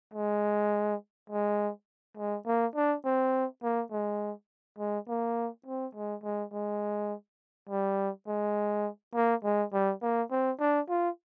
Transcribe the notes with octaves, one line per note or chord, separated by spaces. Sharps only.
G#3
G#3
G#3
A#3
D4
C4
A#3
G#3
G#3
A#3
C4
G#3
G#3
G#3
G3
G#3
A#3
G#3
G3
A#3
C4
D4
F4